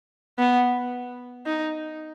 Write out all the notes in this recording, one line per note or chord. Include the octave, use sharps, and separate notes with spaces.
B3
D#4